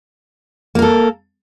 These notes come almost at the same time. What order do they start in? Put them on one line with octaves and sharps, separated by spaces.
A#3 A#4 A4